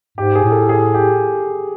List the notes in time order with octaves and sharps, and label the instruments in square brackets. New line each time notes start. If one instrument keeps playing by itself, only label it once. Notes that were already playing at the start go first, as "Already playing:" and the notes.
[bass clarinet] G#2 [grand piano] G4
[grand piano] G#4
[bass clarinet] A2
[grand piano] A4
G#4
G4